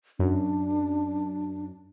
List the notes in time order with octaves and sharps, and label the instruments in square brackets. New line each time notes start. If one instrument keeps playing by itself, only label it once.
[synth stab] F#2 [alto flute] D4